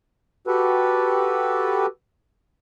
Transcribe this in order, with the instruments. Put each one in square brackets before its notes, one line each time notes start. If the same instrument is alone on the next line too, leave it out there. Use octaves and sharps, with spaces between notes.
[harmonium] F#4 G4 A4 B4